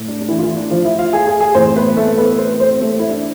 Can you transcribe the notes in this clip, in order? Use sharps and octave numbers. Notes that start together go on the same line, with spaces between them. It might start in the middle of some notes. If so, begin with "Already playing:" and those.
Already playing: A2
D4
D4
E3 E4
F4
E3 E4
D4
F3 F4
E4 E5
F4 F5
G#4 G#5
G#4 G#5
G#4 G#5
A2 E3 C4 C5
B3 B4
A3 A4
B3 B4
C4 C5
C4 C5
A3 A4
E4
D4